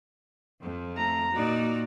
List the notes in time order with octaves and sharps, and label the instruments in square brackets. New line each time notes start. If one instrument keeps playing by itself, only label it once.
[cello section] F2
[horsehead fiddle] A3 A#5
[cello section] A#2 D#4 D5 [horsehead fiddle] F#4